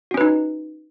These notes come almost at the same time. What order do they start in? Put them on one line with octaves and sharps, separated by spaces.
F#4 C#4 B4 D#4